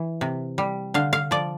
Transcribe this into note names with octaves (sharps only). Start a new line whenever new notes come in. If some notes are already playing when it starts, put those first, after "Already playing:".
Already playing: E3
C3
G3
D3 F5
F5
F3 D5